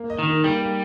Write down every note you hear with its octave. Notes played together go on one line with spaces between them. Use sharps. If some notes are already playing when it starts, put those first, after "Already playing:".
Already playing: A#3
D#5
D#3
D#4
G3 A#3
A#3